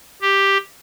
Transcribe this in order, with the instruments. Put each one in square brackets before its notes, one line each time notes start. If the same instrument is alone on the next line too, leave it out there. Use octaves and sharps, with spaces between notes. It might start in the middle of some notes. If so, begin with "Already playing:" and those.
[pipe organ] G4